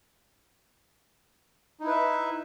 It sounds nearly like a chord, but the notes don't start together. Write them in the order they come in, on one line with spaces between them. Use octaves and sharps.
D#4 E4 B4 E5